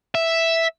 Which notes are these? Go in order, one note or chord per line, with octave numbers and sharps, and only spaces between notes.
E5